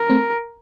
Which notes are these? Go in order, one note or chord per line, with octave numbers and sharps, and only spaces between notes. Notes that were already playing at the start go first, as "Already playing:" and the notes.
Already playing: A#4
A3 C4